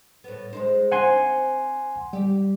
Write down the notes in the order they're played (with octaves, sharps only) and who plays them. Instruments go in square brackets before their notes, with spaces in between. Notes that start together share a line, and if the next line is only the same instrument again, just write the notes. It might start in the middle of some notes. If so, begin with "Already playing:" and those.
[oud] A2 B3
G#3 D#4 C5
[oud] C4 D#4 [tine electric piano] F#5 G#5 C6
[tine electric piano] G3 [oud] G4